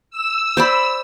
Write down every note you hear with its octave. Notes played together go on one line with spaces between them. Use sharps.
E6
C5 D5 B5